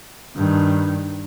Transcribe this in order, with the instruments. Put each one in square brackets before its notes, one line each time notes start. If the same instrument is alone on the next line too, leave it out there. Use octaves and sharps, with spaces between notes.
[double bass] G2 D#3